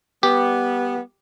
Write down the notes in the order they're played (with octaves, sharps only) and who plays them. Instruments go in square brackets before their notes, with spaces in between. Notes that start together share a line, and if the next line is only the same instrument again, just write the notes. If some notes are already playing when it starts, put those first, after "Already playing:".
[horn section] G3 B3 [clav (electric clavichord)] G4